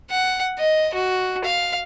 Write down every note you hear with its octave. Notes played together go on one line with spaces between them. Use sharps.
F#5
D#5
F#4
F5